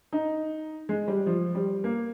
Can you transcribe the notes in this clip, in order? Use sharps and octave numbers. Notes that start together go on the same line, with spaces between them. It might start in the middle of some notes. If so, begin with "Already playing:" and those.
D#4
G#3
G3
F3
G3
A#3